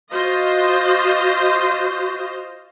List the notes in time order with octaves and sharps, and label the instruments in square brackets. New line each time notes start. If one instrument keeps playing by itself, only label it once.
[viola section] F4 C5 D#5 [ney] F#4